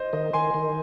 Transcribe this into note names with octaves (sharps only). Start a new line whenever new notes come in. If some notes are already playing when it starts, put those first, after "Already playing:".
Already playing: C5 D#5
D#3 D#5
D#3 G#5 C6
D#3